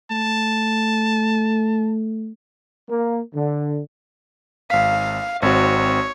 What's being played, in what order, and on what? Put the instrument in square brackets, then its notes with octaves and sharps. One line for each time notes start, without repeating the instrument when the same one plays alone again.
[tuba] A3 [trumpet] A5
[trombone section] A#3
D3
[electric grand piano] G#1 B6 [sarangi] F5
[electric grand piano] G#1 C4 F#4 [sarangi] C#5